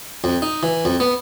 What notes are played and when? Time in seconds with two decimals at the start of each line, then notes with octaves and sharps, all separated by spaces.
0.24 F2
0.42 D#4
0.63 E3
0.85 F2
1.00 B3